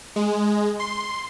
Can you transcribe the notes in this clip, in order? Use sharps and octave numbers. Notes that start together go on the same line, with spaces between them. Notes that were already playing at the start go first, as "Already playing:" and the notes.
G#3
C6